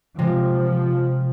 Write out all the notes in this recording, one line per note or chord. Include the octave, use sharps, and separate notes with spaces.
C3 F3 G#3